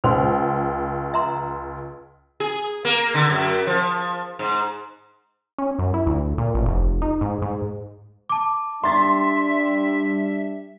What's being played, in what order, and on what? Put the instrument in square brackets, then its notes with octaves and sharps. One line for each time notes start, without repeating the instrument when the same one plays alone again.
[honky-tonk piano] C#2 [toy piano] C5 C6
[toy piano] E5 A#5 C6
[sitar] G#4
A#3
D3
F#2
F3
G#2
[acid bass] C#4
F#2
E4
D2
A#2
A1
F1
D#4
G#2
G#2
[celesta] A5 D6
[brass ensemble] G3 D4 [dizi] E5 [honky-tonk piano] C6 A6